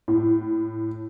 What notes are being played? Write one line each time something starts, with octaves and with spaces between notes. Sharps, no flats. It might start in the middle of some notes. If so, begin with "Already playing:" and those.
A2